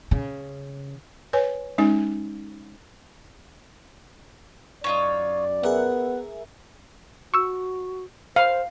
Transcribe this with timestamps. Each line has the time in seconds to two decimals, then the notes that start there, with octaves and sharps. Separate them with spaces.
0.11 C#3
1.33 B4 C#5 G#5
1.78 G#3 C#4 D#4 G#5
4.84 F#2 D#4 F4 C#5 D5
5.63 B3 G#4 A#4 E5 F#5
7.34 F#4 C#6 E6
8.36 C5 F5